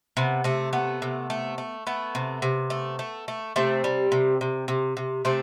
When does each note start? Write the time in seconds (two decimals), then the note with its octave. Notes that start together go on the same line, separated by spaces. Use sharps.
0.17 C3 B3
0.44 C3 A3
0.73 A3 B3
1.02 C3
1.30 A3
1.58 A3
1.87 A3 B3
2.15 C3
2.42 C3
2.70 A3
2.99 A3
3.28 A3
3.56 C3 A3 C4
3.84 G3
4.12 C3
4.41 C3
4.68 C3
4.97 C3
5.25 C3 A3 C4